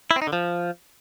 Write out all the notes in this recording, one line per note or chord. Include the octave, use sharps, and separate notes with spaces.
E4
C4
D#4
D3
F3